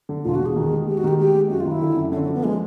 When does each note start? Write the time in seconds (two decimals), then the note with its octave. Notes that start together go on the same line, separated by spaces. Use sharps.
0.09 D3
0.25 E1 F4
0.35 F#4
0.41 E1
0.46 G#4
0.56 D#3
0.73 G#3
0.87 G#3 G4
0.98 F#4
1.04 D#3 G4
1.19 G#3 G4
1.35 G#3
1.50 F#2 F#4
1.60 F4
1.66 D#3
1.71 E4
1.82 D3
1.96 F#2
2.12 D3 C#4
2.23 C#4
2.29 F3
2.34 B3
2.44 F3 G#3